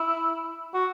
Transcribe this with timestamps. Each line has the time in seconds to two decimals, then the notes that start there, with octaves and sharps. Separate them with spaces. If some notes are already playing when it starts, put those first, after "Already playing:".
Already playing: E4
0.74 F#4